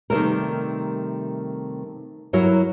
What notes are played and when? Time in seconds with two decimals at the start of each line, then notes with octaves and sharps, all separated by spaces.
0.10 C3 D#3 E3 G3 A3 A#4
2.33 F#3 E4 F#4 A#4 C#5